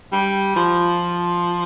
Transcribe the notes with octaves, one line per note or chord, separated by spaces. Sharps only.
G3
F3